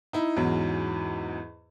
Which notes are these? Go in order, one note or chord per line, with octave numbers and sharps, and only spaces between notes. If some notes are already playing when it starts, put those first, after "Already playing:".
D#4 E4
E2 G#2 F#3 C#4